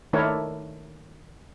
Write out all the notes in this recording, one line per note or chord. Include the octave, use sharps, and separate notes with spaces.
D#3 A3 D4 E4 A#4 C#5